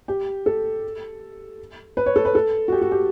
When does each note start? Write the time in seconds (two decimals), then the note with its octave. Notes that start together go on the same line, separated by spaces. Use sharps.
0.08 G4
0.46 A4
1.97 B4
2.06 C#5
2.16 A4
2.25 B4
2.35 A4
2.68 F#4
2.72 G4
2.81 F#4
2.92 G4